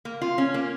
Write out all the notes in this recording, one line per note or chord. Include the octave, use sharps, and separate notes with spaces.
A#3
F4
C#4
A#3